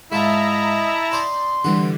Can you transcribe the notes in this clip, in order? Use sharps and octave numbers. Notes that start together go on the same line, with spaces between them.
G#2 E4 F4 D#5 E5 A5 A#5
D#4 C5 D5 C6
D3 E3 G3 F#4